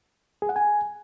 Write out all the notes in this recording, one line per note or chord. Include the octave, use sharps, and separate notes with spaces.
G#4
F#5
G#5